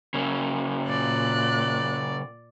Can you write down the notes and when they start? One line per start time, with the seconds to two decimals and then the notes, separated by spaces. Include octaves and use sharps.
0.14 C#3 A#3
0.88 A#2 D5 F#6